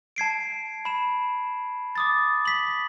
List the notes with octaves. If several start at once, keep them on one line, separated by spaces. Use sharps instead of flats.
A5 G#6 C7 D7
B5 E7
D6 D#6 A6
B6 F#7